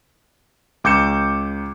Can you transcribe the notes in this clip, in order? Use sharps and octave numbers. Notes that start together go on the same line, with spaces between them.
C#2 D6 G6 C#7 E7